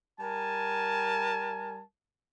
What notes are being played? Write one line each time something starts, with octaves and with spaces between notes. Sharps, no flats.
G3 A#4 G#5 A5